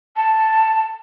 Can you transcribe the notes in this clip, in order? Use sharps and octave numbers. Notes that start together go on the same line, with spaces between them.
A5